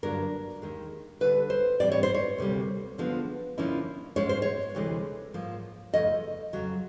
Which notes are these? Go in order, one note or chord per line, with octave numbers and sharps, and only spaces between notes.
G2 D3 F#3 A#3 D4 A#4
D#2 D#3 G#3
D2 D3 G3 B4
C5
G#2 E3 G3 C4 D5
C#5
C5
C#5
D2 C3 E3 G3 A#3
D3 F3 G#3 B3
D3 F3 A#3 C#4 E4
G#2 F3 G#3 C#4 C#5
C5
C#5
D2 C3 E3 G#3
G#2 F3 A#3
F2 C#3 F3 A3 D#5
F2 C#3 F#3